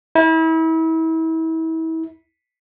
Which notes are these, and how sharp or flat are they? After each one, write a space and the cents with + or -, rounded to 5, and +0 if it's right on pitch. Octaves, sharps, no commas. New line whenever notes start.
E4 -35